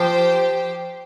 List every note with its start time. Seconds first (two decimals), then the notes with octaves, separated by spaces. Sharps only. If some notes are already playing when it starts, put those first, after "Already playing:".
Already playing: F3 G4 C5 G5